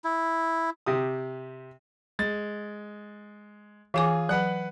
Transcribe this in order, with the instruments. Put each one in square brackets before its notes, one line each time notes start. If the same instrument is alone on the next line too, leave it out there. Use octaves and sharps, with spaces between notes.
[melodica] E4
[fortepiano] C3 G4 D#6
[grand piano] G#3 A6
[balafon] E3 G#5 D6 [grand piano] F4 G#4
[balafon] F#3 [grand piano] B4 F#5 F#6